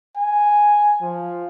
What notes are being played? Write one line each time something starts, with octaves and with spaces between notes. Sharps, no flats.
G#5
F3